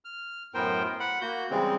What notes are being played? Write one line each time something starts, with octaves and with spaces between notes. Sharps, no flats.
F6
F#2 A2 B3 A#4 C5 G5
F#5 B5
A#3 F#4 G6
C#3 E3 G3 G#3 C4